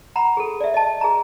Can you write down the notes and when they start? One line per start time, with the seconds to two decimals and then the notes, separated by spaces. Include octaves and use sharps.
0.16 F#5 A#5 B5
0.37 G#4 A4
0.60 D5 E5
0.74 D#5 A5
1.01 G#4 A#5